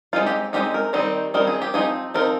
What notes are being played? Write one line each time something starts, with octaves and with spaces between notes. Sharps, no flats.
G#3 C4 D#4 F4
G4
G#3 C4 D#4 G4
A#4
D#3 G3 C4 D#4
D#3 G3 C4 D#4 A#4
G#4
G4
F3 C4 D#4 G#4
F3 C4 D#4 A#4